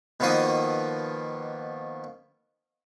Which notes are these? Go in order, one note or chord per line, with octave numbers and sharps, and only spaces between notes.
B2 D#3 F3 A#3 C#6 D#6